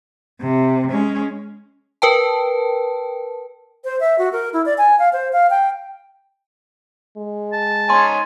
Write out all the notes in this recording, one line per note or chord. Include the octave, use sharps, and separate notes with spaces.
C3
G#3 C#4
A#4 B4 G5 A5
C5
E5
F#4
A#4
E4
D5
G#5
F5
C5
F5
G5
G#3
A5
D#4 C#5 G#5 A#5 C6